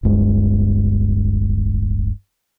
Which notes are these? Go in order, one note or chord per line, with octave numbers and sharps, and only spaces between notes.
D1 G1 G2 G#3